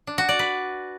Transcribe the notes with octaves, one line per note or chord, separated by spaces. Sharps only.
D4
F#4
D5
B4